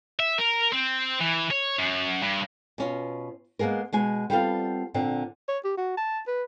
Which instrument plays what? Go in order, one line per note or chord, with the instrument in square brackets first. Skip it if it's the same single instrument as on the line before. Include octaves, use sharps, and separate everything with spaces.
[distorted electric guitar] E5
A#4
C4
E3
C#5
F#2
G2
[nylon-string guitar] B2 C#4 F4
G#3 A#3 B3 G#4 A#4
B2 G#3 G#5
G3 B3 C4 F4 A4 F5
A#2 D3 C4
[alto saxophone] C#5
G4
F#4
A5
B4